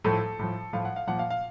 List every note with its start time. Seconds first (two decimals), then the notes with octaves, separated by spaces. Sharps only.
0.04 A2 F3 A4
0.39 A2 F3
0.73 A2 F3 F5
0.85 F#5
0.96 F5
1.07 A#2 F3 F#5
1.19 F5
1.30 F5